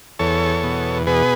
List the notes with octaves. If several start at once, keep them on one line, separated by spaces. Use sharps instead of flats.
E2 A4 C#5
B2
B2 G#4 B4